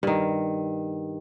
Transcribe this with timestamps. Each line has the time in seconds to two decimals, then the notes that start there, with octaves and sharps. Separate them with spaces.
0.03 G2 D#3